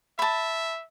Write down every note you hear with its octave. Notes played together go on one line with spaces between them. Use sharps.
E5 A5 B5